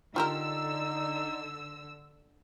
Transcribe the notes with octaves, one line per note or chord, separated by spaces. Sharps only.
D3 D#4 F4 G4 A#4 E6